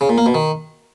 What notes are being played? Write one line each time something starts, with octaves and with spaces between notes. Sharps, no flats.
C#3
A#2
A#3
B2
D#3